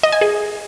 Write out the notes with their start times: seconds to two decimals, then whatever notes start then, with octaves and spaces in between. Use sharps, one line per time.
0.03 D#5
0.12 G#5
0.21 G#4